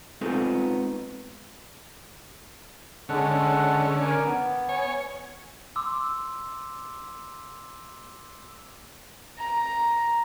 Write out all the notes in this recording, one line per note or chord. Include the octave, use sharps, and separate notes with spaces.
G#3 B3 C4 D#4 F4 A4
D3 G#3 C#4 A4 F#5
A#4 G#5 D6
B3
C#5 G#5
C6 D6 E6
A#5